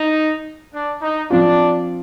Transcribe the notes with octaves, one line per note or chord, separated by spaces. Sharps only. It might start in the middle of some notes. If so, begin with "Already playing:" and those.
Already playing: D#4
D4
D#4
F3 C4 D4 F4